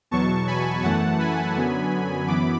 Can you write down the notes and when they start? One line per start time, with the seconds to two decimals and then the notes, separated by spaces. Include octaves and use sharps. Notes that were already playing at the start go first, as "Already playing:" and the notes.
0.11 E2 B2 F#3 A5 C#6
0.47 G#5 B5
0.83 F#2 E3 A3 F#5 A5
1.19 G#5 B5
1.56 F#2 D3 F#3 B3
2.28 F#2 E3 B3 B5 D6